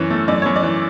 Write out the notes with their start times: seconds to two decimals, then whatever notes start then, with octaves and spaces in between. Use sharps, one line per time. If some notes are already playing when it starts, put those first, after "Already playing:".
Already playing: F#2 E3 C#5
0.10 A3
0.28 F#2 D5
0.42 F#2 C#5
0.56 D5
0.63 E3